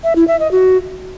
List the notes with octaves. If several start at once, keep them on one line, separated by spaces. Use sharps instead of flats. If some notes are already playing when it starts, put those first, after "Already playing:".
E5
E4
E5
D#5
F#4